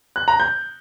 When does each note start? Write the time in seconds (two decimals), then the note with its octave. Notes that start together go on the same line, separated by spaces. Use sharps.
0.16 F#6
0.28 A#5
0.40 G6